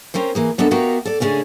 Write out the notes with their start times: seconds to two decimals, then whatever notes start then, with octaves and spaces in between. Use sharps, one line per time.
0.14 C4 C#4 A#4 C5
0.35 E3 A#3 G#4
0.58 G#3 B3 D4 A4 A#4 E5
0.71 B3 F#4 G4 A#4 E5 F5
1.05 A4 D5
1.20 C#3 A3 C#4 D4 G#4